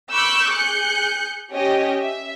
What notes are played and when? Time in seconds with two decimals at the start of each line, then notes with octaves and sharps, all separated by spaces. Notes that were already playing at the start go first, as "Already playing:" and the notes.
0.11 B5 C#6 D6 E6 F#6 G6
0.50 G#4 F#6 G6 C#7
1.51 C#4 G4 D#5
2.00 E5